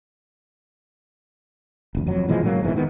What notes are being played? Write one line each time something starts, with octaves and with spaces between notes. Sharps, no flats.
F1 D2
F2 F#3
A#2 E3 F3 G#3
G#2 C#3 F#3 A#3
E1 E2 G#2 E3
D#3 B3